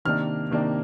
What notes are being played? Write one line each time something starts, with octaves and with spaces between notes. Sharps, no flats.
C3 D#3 A#3 D4 F6
C3 D#3 A#3 D4